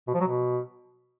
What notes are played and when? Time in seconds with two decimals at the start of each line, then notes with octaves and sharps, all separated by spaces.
0.07 B2
0.14 F3
0.21 F#3
0.27 B2